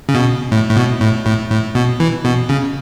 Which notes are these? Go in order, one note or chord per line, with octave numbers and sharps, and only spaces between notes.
C#3
B2
A2
A2
B2
A2
A2
A2
B2
E3
B2
C#3